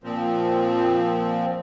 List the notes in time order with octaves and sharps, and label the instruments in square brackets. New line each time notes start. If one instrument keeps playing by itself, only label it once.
[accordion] A#2 F3 C4